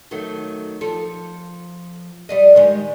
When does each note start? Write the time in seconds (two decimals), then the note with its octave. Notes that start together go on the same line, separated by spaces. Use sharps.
0.11 D#3 F#3 A3
0.81 F3 A4
2.29 G3 D5 D#5
2.55 D#3 G3 G#3